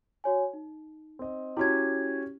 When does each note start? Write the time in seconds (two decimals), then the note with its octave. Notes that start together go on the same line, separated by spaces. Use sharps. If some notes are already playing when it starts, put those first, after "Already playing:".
0.24 F#4 C#5 G#5
0.53 D#4
1.19 C4 D#5
1.57 C#4 E4 F#4 G4 G#6